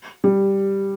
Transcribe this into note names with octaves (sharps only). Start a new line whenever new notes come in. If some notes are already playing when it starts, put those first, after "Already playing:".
G3